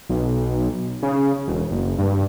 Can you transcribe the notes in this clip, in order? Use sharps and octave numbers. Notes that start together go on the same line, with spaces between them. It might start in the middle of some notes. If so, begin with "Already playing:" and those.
B1
C#3
E1
F#1
G2